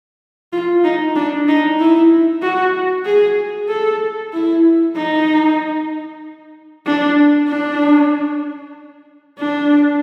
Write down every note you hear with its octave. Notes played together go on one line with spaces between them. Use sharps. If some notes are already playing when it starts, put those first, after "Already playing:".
F4
D#4
D4
D#4
E4
F#4
G#4
A4
E4
D#4
D4
D4
D4